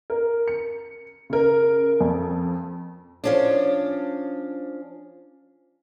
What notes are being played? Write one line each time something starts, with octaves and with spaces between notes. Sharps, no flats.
A#4
C#7
C#3 A#4
F2
F3 C#4 D4